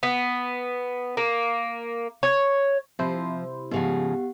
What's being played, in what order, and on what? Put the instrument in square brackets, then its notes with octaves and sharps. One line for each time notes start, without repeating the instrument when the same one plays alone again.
[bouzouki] B3
A#3
C#5
[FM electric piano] C3 E4 C5 [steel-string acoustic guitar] F3
[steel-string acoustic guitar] G#2 C#3 F3 [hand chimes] B3 G4 F#5